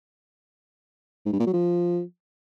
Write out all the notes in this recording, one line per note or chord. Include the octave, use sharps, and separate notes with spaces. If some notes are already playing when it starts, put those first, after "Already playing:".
G#2
G2
A#2
F#3
F3